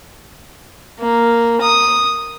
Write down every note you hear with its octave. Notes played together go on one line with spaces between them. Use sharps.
A#3
D#6